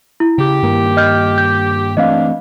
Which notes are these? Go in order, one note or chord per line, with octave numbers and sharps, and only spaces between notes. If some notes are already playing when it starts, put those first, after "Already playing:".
E4
C#3 G4
G2 D#3 A#3
D#5 F6 G6
G6
D3 E3 G3 A3 C4 D4 D#5 F5